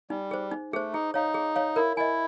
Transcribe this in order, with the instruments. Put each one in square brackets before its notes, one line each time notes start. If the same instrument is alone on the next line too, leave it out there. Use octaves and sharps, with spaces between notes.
[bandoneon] G3 [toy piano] D#4
[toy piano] G#4 C5
D#4
[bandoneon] A3 [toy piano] G#4 C5
[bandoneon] D#4 [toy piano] G#4
[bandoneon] D#4 [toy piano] C#5 F5
[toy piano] G#4
C#5 F5
[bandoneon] E4 [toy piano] A#4
[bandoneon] E4 [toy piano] D#5 G#5